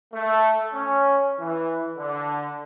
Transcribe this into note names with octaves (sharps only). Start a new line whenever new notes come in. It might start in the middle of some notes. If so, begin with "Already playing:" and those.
A3
C#4
E3
D3